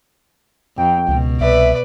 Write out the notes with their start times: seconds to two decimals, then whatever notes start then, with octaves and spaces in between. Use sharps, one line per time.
0.77 F2 G5
1.08 C#2 B2
1.41 C2 B4 D5 E5